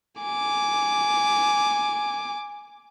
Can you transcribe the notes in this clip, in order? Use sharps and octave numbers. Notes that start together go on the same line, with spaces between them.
G#5 D6